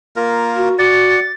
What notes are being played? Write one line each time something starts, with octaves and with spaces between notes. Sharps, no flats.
A#3 F4 A#4
F#4
F#4 D5 F#5 A6